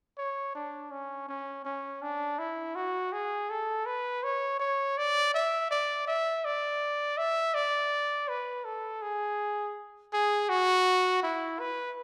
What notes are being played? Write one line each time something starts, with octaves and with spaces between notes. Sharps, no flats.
C#5
D4
C#4
C#4
C#4
D4
E4
F#4
G#4
A4
B4
C#5
C#5
D5
E5
D5
E5
D5
E5
D5
B4
A4
G#4
G#4
F#4
E4
B4